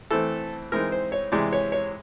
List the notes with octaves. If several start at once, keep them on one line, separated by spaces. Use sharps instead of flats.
E3 A3 C4 A4
E3 G#3 C4 D#4 A#4
C5
C#5
C3 E3 G#3 D5
C#5
C#5